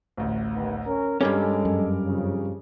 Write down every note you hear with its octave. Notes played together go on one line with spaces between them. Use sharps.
A1 D2
D#2 D#3 B3
C#4 A#4
G2 G3 G#3 C#4 A4 A#4 D6
F#2
F2 C#3